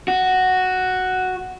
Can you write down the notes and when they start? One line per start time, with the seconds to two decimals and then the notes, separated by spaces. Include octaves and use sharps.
0.08 F#4